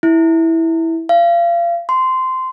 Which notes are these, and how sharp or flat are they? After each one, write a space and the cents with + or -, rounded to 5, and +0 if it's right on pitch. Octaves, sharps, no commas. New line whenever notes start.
E4 -10
F5 -30
C6 -15